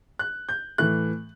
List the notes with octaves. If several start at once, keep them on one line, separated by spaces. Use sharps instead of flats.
F#6
G6
A2 E3 F#6